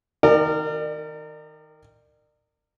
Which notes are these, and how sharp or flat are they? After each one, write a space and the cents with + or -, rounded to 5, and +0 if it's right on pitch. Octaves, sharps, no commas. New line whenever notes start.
D#3 +20 A#4 -25 D5 +35